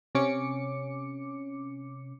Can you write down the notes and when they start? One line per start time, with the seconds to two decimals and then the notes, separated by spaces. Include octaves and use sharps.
0.15 C3 C#4 D6 C#7